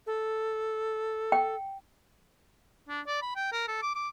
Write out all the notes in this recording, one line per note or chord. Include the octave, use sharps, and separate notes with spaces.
A4
G5
D4
D5
B5
G5
A#4
A4
D6
D6